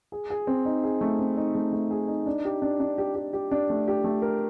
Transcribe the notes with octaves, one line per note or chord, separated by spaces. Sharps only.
G#4
G#4
C4
D#4
G#4
A3
C4
D#4
A3
A3
G#4
D#4
D4
G4
D4
D4
G4
G4
G4
D4
A3
G4
A3
A#4